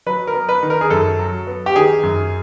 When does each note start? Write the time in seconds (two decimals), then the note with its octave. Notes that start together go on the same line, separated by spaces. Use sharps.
0.06 F#3 B4
0.27 A#4
0.34 B3
0.49 B4
0.62 D#3
0.70 A#4
0.81 G#4
0.90 F#2 A4
1.19 F#3
1.47 B3
1.66 G4
1.76 D#3 G#4
2.03 F#2